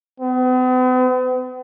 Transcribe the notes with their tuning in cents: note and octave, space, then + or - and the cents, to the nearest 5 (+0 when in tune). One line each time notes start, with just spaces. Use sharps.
B3 +45